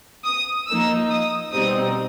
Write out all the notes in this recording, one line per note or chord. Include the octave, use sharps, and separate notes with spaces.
D#6
F3 A#3 D#4 E6
D#6
B2 G3 C4 D#4 D#6